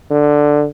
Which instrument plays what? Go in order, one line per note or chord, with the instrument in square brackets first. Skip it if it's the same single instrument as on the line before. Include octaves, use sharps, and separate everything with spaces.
[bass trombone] D3